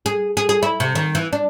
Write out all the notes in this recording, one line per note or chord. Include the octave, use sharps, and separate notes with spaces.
G#4
G#4
G#4
E4
C3
D#3
E3
D4